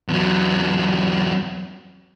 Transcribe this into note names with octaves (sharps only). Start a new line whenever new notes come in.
E2 F#3